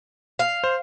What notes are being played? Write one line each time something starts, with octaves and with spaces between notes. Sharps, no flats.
F5
C5